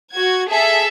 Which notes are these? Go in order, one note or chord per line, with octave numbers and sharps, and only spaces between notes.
F#4 G#6
G#4 A4 E5